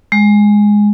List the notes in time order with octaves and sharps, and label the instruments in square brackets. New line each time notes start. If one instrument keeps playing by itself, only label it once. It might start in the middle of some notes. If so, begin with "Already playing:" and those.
[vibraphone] G#3